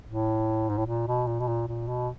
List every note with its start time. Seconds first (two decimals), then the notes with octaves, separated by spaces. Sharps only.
0.06 A2
0.69 G#2
0.77 A2
0.86 A#2
1.07 B2
1.27 A#2
1.40 B2
1.48 A#2
1.68 A#2
1.87 B2